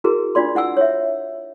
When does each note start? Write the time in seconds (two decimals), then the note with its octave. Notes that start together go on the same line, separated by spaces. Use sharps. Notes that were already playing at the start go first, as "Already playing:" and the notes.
0.04 E4 F#4 G#4 A#4
0.35 D4 F4 D5 C6
0.55 E4 F#5 G#5 E6
0.77 C#5 E5